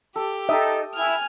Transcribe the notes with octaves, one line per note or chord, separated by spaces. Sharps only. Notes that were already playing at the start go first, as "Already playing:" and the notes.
G4 A4
D#4 A4 E5 G5 A5 D#6
E4 G#5 F6